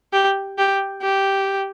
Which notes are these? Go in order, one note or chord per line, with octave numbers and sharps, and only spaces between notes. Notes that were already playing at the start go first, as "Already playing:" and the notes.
G4
G4
G4